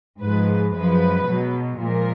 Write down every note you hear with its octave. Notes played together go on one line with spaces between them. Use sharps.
G#2 F3 G#3 B4
F#2 F3 G#3 B4
B2 F#3
A#2 F3 G#3 A#4